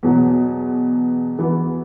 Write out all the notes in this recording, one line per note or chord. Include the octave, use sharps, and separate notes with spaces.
E2 B2 F#3
E2 E3 B3 F#4